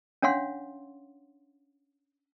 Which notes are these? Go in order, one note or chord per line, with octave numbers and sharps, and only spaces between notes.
C#4 D4 C#5 F5 F#5 C6